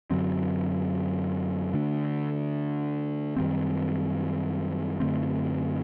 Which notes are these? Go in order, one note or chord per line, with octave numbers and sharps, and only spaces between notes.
F#2 D3 F#3 C4
D3 A3 D4
F#2 D#3 G3 C4
F#2 D3 A3 C4